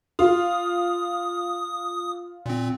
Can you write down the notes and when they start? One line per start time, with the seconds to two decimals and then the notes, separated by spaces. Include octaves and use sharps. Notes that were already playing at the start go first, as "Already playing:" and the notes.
0.19 F4 D#6
2.46 A#2 C4